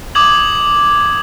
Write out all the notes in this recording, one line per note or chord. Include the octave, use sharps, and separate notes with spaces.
D6 D#6 G#6 F#7